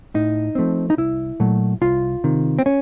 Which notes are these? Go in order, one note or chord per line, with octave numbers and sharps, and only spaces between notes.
A2 D#4
F3 A3 C4
D#4
C2 E4
A#2 F#3 A3
C2 F4
C3 D#3
C4
C#4